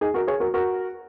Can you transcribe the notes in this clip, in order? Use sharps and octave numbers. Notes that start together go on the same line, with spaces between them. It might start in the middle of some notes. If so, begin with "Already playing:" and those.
D#4 G#4
F#4 A#4
G#4 C#5
F#4 A#4
F#4 A#4